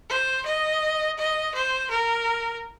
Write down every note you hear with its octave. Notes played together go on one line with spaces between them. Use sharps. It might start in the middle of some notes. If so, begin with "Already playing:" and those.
C5
D#5
D#5
C5
A#4